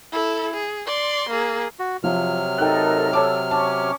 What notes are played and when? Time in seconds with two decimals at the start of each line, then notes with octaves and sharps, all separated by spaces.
0.12 E4 A4
0.54 G#4
0.87 D5 C6
1.29 A#3 G#4
1.79 F#4
2.04 C3 F3 F#3 F6
2.58 D#4 A4 A#4 G5 F#6
3.13 A4 C#5 A5 D6 E6
3.51 C#4 A5 C#6 D6